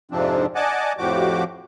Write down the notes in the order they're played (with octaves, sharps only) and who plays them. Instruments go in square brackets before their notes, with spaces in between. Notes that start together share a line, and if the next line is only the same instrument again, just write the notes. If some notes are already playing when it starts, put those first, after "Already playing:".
[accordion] F2 G#2 C3 F3 C4 D4
D5 D#5 F#5 G#5 A5 D6
F2 A2 F3 F#4 G4 D6